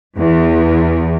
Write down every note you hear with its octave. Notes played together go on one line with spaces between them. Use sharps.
E2